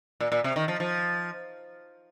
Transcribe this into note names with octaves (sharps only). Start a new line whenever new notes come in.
A#2
A#2
C3
D#3
F3
F3